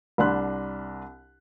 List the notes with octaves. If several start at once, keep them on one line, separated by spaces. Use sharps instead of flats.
C2 D4 F#5 B5 C6 F#6